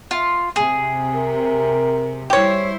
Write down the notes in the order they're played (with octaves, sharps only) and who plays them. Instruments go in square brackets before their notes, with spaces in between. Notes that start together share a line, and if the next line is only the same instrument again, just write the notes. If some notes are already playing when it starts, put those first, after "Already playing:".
[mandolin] F4
[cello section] C3 [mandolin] G#4
[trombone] A#4
[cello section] G3 E4 C5 [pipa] G4 C#5